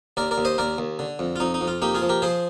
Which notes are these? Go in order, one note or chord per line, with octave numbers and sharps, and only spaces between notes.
D#2 A#4 D5
A#4 D5
D#2
C5 D#5
D#2 A#4 D5
D#2
D3
F2
F4
F2 D#4
D#4
F2
F4
A#3 D#4 G4
F4 G#4
F3
G4 A#4
F3 G#4 C5